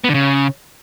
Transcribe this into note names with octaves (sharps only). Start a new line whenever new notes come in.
B3
D3
C#3